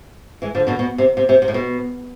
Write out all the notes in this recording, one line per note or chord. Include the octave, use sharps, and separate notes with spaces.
E3 G#3
D3 F3
B2 D3
B2
C3
C3
C3
C3
A2
B2